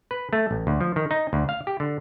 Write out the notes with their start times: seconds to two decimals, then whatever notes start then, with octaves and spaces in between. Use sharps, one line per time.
0.11 B4
0.33 A3
0.51 A1
0.67 D2
0.81 F3
0.96 D#3
1.11 D#4
1.33 D2
1.49 F5
1.67 G4
1.80 D3